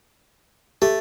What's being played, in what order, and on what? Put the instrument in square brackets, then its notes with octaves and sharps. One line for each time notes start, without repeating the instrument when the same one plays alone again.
[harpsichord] A3 [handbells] G4